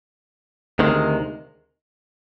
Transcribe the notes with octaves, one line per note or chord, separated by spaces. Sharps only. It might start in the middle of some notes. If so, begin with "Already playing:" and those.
D2 C3 D#3 G#3